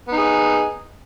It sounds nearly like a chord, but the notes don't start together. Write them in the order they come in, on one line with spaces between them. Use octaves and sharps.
B3 D#4 G#4